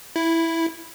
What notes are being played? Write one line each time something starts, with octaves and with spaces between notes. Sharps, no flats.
E4